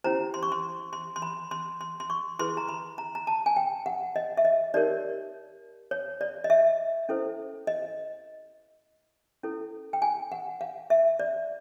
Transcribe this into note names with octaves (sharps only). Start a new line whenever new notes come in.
C#4 E4 G4 C5 A#5
C6
C#6
C6
C6
C6
B5
C6
C6
C6
C#6
E4 G#4 B4 C6
A#5
B5
A#5
A#5
A5
G#5
G5
F#5
D#5
E5
D#5
D#4 G4 A#4 C#5 D5
C#5
D5
D#5
E5
C#4 E4 A4 C5
D#5
C#4 E4 A4
G5
G#5
F#5
F5
E5
D5